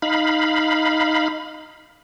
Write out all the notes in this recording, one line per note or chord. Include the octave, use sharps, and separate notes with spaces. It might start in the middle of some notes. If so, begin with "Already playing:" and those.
D#4 F5 B5